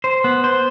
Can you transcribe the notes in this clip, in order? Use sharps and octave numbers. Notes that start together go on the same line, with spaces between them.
C5
B3
C5